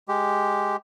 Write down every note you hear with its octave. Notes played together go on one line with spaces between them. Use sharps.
G#3 G4